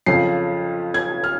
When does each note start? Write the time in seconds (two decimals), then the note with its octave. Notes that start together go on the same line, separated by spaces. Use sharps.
0.06 F2 C#3 F3 C7
0.94 G#6
1.24 F6